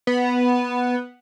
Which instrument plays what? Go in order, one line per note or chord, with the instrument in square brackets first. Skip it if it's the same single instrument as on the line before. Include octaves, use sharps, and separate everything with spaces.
[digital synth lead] B3